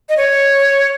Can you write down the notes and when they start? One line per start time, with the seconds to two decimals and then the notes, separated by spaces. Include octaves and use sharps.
0.09 D#5
0.17 C#5